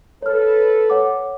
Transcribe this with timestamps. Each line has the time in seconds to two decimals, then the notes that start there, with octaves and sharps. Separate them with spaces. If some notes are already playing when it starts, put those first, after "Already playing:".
0.22 A4 B4 C#5 F6
0.90 C#5 F#5 D6